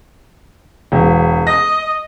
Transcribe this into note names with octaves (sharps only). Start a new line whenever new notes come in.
E1
D#5 A#6